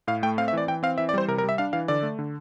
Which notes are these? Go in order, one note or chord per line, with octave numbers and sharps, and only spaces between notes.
A2 F5
A3 G5
C4 F5
E5
E3 D5
E3 G5
C4 F5
E3 E5
D5
G3 C5
C3 A#4
A#4
G3
E5
D4 F5
E3 F5
D3 D5
A3
D3